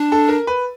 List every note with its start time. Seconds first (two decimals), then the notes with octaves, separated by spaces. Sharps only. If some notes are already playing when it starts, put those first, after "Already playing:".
Already playing: D4
0.12 A4
0.29 A#4
0.47 B4